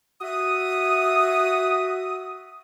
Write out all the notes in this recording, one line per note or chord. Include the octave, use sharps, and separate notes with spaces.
F#4 E5 D#6